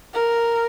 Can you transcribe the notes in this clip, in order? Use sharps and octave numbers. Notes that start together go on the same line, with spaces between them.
A#4